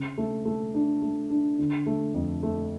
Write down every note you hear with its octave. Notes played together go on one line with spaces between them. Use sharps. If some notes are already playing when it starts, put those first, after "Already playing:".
Already playing: C#3
A3
A3
D4
A3
D4
D3
A3
F2
A3